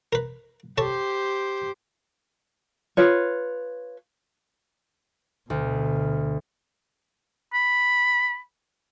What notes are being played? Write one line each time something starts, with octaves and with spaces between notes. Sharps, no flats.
A#4 B4
G4 A4 C5 C#5 A5
F4 B4 C#5
D2 B2
B5